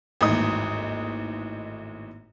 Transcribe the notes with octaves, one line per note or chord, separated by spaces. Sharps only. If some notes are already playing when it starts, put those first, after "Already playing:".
G#1 D#2 A2 E3 D#4 D#6